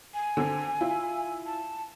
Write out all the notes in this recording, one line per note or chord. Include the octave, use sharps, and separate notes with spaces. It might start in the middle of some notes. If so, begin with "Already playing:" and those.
G#5
D3 C4
E4 F4
A5